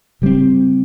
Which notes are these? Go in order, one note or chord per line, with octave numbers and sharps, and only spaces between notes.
C#3 G3 C4